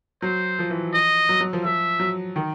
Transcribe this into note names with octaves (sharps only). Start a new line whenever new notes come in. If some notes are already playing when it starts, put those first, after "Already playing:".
F#3 C5
F3
E3
D#5
F#3
F#3
F3
F3 E5
F#3
D#3